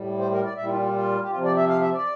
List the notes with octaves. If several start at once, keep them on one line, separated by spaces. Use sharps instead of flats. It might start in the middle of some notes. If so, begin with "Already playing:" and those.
Already playing: A2 G3
C5
A#4
D5
A#2 G3 E5
E4
F4
F4
F4
G4
C3 F3 F4
D5
E5
F5
E5
D5